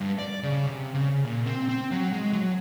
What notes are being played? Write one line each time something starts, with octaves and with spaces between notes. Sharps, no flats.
G2
D5
C#3
C3
C#3
A#2
C4
C4
F#3
G#3
F#3